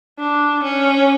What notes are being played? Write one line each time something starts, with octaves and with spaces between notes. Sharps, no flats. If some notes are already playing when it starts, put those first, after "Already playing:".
D4
C#4